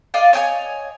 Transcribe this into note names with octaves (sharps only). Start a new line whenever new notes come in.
F4 D5 D#5 F5
C#5 D#5 G5 G#5